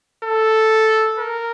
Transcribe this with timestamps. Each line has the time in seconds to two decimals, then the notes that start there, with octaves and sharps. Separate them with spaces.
0.25 A4
1.19 A#4